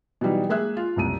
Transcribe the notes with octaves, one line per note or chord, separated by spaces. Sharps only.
B2 E3 F#3 G3 D#4
G#3 A#3 G#4 E5 F#6
F4
F#1 C2 D#7